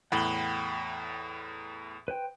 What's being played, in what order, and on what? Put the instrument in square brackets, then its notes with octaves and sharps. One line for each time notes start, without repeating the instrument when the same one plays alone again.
[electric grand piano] E2 A2 [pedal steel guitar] F#5 G5 F#6 [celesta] B5 F#7 G7
[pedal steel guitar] B4 C5 G5